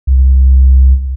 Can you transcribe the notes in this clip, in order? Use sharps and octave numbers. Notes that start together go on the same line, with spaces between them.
C2